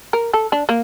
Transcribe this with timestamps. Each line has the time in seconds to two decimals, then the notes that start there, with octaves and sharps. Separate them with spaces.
0.13 A#4
0.33 A4
0.52 D4
0.69 A#3